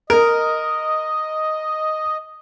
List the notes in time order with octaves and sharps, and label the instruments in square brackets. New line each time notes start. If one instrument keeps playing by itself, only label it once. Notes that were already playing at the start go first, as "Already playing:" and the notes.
[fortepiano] A#4 [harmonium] D#5